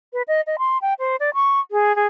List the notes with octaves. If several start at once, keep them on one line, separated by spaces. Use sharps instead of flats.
B4
D#5
D#5
C6
G5
C5
D5
C#6
G#4
G#4